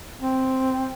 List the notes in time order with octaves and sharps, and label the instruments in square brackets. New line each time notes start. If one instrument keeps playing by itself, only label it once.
[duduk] C4